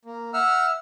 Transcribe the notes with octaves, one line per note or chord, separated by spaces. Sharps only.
A#3
E5 F#5 E6 F6